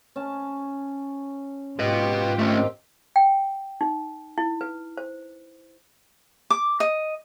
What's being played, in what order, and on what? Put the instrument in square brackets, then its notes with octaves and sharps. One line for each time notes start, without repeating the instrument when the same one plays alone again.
[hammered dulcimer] C#4 A5
[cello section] G#2 F4 G4 [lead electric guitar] B4 D#5
[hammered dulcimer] D#3 C4 [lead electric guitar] A3 C#4
[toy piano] G5
D#4
E4
B4
C5
[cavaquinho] D6
D#5